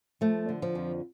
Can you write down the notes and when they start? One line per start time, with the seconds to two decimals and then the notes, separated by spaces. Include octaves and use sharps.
0.21 F3 A3
0.49 D3
0.62 F3
0.75 F2